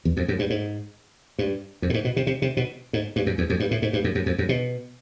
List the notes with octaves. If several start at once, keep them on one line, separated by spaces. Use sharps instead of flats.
E2
F2
F#2
G2
G#2
G2
F2
A2
G#2
B2
C3
C3
C3
B2
G#2
G2
F#2
E2
F2
G2
A2
G#2
G2
F#2
F#2
F2
F#2
B2